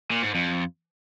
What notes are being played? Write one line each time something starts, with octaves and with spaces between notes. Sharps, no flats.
A#2
G#2
F2